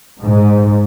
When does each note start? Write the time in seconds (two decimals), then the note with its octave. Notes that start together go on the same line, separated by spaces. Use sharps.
0.22 G#2